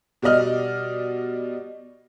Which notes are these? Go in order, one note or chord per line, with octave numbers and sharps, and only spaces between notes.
B2 G3 D5 D#5 F6